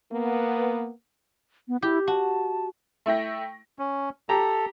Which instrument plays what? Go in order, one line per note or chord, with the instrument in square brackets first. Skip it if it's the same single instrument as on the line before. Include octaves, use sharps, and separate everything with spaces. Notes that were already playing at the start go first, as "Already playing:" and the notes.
[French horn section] A#3 B3
[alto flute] B3
[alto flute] E4 [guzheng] G4
[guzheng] F#4 [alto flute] A5
[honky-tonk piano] A3 E4 G5 A#6
[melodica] C#4
[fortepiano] G4 A#5 [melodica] A4